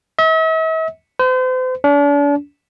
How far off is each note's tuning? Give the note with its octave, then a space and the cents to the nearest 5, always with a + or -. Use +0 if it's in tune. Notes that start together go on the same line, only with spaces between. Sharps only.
E5 -45
C5 -40
D4 -40